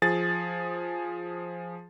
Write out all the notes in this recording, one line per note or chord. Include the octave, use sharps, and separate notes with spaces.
F3 G#4 A6